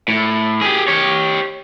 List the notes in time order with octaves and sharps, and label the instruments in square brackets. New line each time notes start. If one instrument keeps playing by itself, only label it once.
[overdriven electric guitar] A2
G4 G#4
G4 C#5